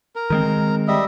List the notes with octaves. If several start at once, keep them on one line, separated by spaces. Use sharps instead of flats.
A#4
D#3 G#3 C4
G3 D#5 E5